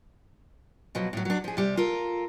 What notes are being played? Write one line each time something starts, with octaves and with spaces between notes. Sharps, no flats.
B2 F3 F#3
A2 F#3
F#3 D4
F3 G#4
C3 G3
F4 A4 A#4